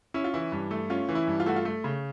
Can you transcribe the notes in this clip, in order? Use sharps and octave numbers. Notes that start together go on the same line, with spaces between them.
C#4 E4
F4
E3 E4
G2
A3
C#4 F4
E3
E4
G2
F4
A3 F#4
F4
A3
C#3